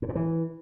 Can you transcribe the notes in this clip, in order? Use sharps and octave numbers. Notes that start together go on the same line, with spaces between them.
A2
A#2
E3